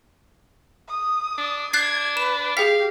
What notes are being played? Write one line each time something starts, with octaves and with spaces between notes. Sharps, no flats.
D#6
D4
D4 F#6 G#6 A6 C7
B4 E7
G4 G#4 F5 G5 B6